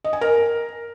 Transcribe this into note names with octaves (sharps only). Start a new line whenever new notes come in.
D#5
G#5
A#4